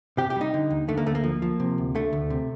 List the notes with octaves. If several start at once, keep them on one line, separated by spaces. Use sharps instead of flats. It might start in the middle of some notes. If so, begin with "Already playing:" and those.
C3 G4
G4
G3
D#4
D3
D#2
D3 A3
A#3
D2 A3
A#3
F3
F3
C3
D2
D3 A3
D2
C3